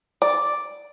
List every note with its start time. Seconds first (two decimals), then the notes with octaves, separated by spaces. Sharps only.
0.22 D5